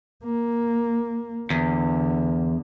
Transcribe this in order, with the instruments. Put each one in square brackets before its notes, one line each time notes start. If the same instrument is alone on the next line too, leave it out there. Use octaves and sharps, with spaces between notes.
[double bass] A#3
[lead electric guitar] E2 [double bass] D3